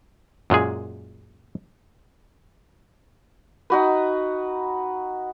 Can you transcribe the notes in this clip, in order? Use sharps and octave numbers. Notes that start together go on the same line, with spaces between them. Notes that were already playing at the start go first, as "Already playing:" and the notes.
F#2 A#2 G#3 G#4
D#4 F#4 B4